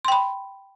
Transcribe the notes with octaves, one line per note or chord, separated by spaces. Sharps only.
G5 B5 C6